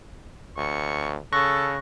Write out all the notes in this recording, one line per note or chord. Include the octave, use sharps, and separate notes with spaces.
D2 C#6
C#3 A4 C#6 F#6 A#6